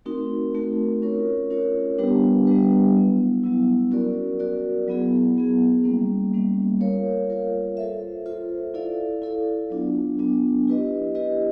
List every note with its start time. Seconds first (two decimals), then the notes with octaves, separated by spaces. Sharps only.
0.05 A3 C4 D#4 F#4 A#4
0.54 A3 C4 D#4 F#4 A#4
1.02 C#4 F4 A#4 C#5
1.50 C#4 F4 A#4 C#5
1.98 G3 B3 D4 G4 B4
2.47 G3 B3 D4 G4 B4
2.95 F#3 B3 E4
3.43 F#3 B3 E4
3.91 C#4 F#4 A#4 D5
4.39 C#4 F#4 A#4 D5
4.88 F#3 B3 E4 G#4
5.36 F#3 B3 E4 G#4
5.84 G3 A#3 C#4
6.33 G3 A#3 C#4
6.81 F4 A#4 C#5 F5
7.30 F4 A#4 C#5 F5
7.77 F4 A4 C5 E5
8.26 F4 A4 C5 E5
8.74 E4 A4 D5 F5
9.22 E4 A4 D5 F5
9.70 F#3 B3 D4 F4
10.18 F#3 B3 D4 F4
10.67 E4 G4 B4 D#5
11.15 E4 G4 B4 D#5